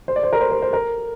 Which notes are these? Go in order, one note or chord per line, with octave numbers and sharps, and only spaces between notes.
C5
D5
C5
A#4
C5
C5
C5
A#4